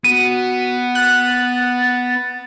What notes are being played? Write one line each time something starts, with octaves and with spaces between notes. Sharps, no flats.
B3 F#4 D#7
F#6 A6